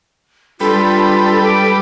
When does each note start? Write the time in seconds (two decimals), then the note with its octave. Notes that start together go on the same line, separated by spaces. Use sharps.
0.60 G3 D4 F4 A4 B4
1.44 D6